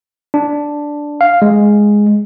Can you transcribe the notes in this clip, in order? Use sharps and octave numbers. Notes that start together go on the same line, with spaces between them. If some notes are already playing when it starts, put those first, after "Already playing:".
D4
F5
G#3